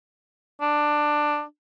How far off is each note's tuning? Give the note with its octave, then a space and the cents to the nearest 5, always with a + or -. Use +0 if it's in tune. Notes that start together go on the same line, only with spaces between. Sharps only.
D4 +15